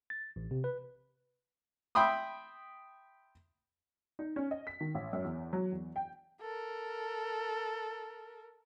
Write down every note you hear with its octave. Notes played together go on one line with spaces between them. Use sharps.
A6
A1
C3
B4
E5 G5 B5 C6 D#6
D#4
C#4
D#5
B6
D#3
A1
F#2
E2
F#3
E2
G5
A4 A#4